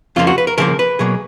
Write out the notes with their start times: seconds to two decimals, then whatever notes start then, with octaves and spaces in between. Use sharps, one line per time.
0.16 F2 C#3 F3 A#3 F4
0.27 F#4
0.38 B4
0.47 A#4
0.58 C#3 F3 A#3 A#4
0.79 B4
0.99 B2 F#3 A#3 G#4